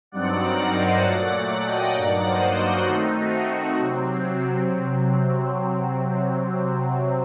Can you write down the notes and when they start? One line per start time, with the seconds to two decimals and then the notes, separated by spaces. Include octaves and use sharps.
0.12 G2 F#3 C4 D#4 D5 F#5
0.42 A#4 D5
0.73 C5 D#5
1.03 A#2 F#3 A3 D5 F#5
1.34 D5 F#5
1.64 D#5 G5
1.95 G2 F#3 A#3 D#4 D5 F#5
2.26 C5 D#5
2.56 F#4
2.87 D#3 A3 C4 D#4
3.18 F#4
3.48 F#4
3.78 C3 F#3 C4